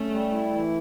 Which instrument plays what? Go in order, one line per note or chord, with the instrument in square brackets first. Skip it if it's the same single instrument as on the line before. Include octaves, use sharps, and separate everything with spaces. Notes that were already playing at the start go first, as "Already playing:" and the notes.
Already playing: [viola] A3 [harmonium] C#4
[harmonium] G3
E4
E3